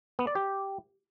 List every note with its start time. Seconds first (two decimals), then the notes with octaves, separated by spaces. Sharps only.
0.19 B3
0.27 D5
0.35 G4